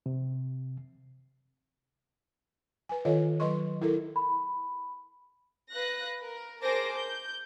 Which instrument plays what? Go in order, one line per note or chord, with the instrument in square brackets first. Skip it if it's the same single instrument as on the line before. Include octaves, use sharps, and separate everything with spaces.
[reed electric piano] C3
[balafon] B4 G#5
D#3 F4 A4 C#5 D#5 F5
F#3 B4 D#5 C6 C#6
E4 A4 A#4
[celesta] B5
[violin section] B4 F5 F#6 A#6
A#4
G#4 A#4 C5 A5 D6 A#6
G6